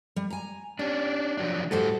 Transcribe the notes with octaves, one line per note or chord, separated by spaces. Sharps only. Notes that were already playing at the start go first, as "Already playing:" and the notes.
G3
G#5 A#5
C#4 D4 G4
F3 F#3 D4
A2 G3 F#4 A4 C5